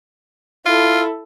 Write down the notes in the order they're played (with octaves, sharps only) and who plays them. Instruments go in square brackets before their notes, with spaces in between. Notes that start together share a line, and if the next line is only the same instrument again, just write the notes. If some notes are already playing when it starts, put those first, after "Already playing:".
[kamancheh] E4 A4 [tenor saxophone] F4